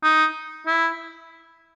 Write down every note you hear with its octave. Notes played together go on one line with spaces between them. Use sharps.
D#4
E4